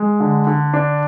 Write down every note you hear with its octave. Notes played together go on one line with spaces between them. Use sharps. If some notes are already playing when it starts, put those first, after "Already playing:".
Already playing: G#3
D3
D3
D4